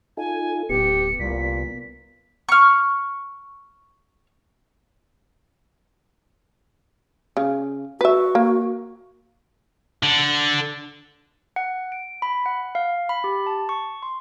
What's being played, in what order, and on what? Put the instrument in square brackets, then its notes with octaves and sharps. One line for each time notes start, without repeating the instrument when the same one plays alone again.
[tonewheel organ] D#4 F4 A4 [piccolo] G#5
[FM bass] D1 [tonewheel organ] B3 [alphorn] G4 [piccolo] C#7
[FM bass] C2 [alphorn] A#2 [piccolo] B6
[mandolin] C#6 F6
[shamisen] C#3
[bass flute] F#4 [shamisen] B4 E5
[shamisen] A#3
[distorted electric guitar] D3
[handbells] F#5
D7
B5
F#5
F5
B5
G4
A5
C#6
C6